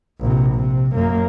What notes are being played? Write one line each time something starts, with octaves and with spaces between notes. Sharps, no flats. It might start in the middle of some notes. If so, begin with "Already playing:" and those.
A#1 C3
C3
F#2 A#3